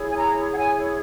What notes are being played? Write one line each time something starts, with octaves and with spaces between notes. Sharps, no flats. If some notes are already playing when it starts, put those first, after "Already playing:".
Already playing: E4 G#4 C#5
G#5
A#5
F#5
G#5